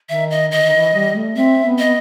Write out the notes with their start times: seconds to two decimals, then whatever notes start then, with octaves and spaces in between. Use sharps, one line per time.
0.09 D#3 E5
0.31 D#5
0.51 D#3 D#5
0.63 D#3
0.73 E3
0.93 G3
1.15 A3
1.36 C4 E5
1.65 B3
1.79 D#5
1.84 B3